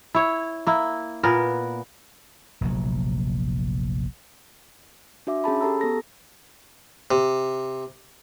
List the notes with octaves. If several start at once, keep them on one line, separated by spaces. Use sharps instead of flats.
E4 C#5
A#3 E4
A#2 B3 A#4
F1 A#1 F#3
D4 F#4 E5 D6
C#4 G#4 A5 B5
G4 A4 A5 A#5 E6
B3 A4 A#6
C3